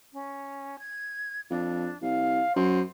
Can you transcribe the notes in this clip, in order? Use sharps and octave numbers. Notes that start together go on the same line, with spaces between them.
C#4
G#6
F2 D4
C2 F5
F#2 C5